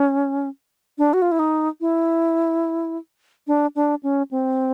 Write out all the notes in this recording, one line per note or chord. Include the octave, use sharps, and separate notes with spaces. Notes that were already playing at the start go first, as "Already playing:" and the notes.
Already playing: C#4
D4
F#4
F4
E4
D#4
E4
D4
D4
C#4
C4